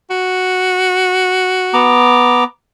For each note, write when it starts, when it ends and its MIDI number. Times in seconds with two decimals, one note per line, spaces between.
0.11 2.01 66
1.74 2.44 59
1.74 2.44 82
1.74 2.44 86